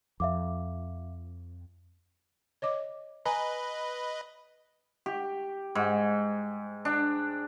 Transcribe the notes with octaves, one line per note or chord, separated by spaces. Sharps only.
F2 E5 F5 D6
C#5 D#5 D6
B4 D#5 G#5 A#5 B5
G4
G#2
D4